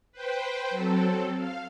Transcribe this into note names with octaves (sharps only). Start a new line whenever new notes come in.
B4 C5 G5
F#3 C4 A4
F5